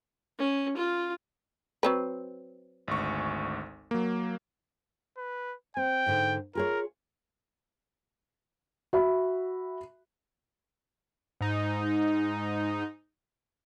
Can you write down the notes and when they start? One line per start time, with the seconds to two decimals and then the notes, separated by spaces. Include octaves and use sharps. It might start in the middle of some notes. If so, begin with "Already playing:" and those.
0.39 C#4
0.77 F4
1.83 F#3 C4 B4
2.88 G#1 D2 C#6
3.91 F#3 A#3
5.17 B4
5.77 C4 G5
6.06 G#2 D3 D#4
6.55 F4 G#4 A#4 C#5
8.93 F#4 E5 B5
11.41 G#2 D#4